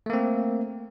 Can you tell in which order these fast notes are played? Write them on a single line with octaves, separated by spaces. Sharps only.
A3 A#3 C4